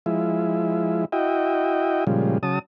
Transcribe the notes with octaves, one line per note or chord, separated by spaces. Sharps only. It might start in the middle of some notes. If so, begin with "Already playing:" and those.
F3 G#3 E4
E4 F#4 D#5 G5
A#2 C#3 F3 G3 G#3
C#3 F#3 A5 D#6